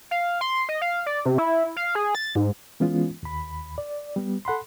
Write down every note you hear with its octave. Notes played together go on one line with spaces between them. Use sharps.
F5
C6
D#5
F5
D5
C3
E4
F5
G#4
A6
G#2
E3 G#3 B3 C#4 F4
D#2 B5
D5
G3 B3
A4 F#5 B5 C6